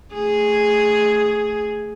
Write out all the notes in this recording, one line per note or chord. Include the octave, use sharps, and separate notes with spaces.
A3 G#4